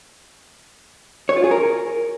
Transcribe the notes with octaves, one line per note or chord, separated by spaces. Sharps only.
C#5
F4
G#4
A#4